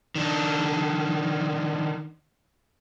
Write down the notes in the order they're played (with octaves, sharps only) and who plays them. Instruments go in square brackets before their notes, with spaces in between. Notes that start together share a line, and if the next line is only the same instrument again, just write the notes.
[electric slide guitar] D#3 D4